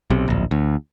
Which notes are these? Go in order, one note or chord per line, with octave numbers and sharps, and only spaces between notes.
B1 C3
D1 A#1
D2